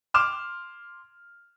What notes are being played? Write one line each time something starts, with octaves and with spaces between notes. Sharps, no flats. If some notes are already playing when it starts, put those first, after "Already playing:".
C6 D6 F6 E7